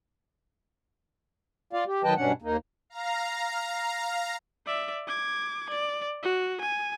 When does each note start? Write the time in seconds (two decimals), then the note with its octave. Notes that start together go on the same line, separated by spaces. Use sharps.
1.73 F4 D5 F5
1.87 G4
2.04 D#3 F#3 B4 D#5 G5 A5
2.17 G2 B2 C#4 D4 F#5
2.42 D#2 A#3 D#4
2.90 F5 A#5
4.66 D5 E5
5.08 D6 G#6
5.70 D5
6.23 F#4
6.61 G#5